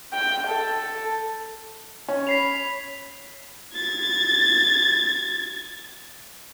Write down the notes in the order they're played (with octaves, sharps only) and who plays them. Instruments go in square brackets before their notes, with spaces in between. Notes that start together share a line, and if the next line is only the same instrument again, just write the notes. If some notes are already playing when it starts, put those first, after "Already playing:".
[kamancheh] G5
A4
[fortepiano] C#4
[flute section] C#5 B5 [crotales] B6 C7 F7
[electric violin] G#6 A6